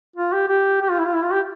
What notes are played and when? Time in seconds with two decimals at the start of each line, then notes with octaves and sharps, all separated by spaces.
0.16 F4
0.32 G4
0.48 G4
0.82 G4
0.90 F4
0.98 E4
1.06 F4
1.15 E4
1.24 F4
1.32 G4